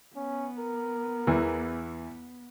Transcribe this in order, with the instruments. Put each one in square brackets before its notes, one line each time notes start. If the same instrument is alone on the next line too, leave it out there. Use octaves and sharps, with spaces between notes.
[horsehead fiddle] B3 [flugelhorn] C#4
[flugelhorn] A#4
[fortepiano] E2 E3